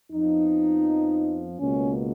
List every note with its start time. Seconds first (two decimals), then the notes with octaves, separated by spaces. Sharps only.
0.12 F2 F3 B3 D#4
1.59 C#2 B2 A#3 C#4